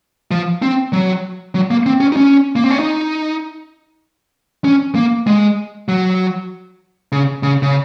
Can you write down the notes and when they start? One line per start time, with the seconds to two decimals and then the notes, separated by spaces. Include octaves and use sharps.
0.31 F3
0.62 C4
0.93 F#3
1.55 F#3
1.71 A#3
1.86 C4
2.00 C#4
2.12 D#4
2.17 C#4
2.56 A#3
2.64 C4
2.70 C#4
2.79 D#4
4.64 C#4
4.95 A#3
5.27 G#3
5.88 F#3
7.12 C#3
7.43 C#3
7.62 C#3